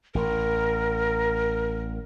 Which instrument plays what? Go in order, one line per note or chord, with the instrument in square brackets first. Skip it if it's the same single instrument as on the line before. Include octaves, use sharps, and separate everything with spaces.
[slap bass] A1 [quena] A#4